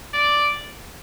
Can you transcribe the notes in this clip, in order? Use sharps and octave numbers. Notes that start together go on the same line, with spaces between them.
D5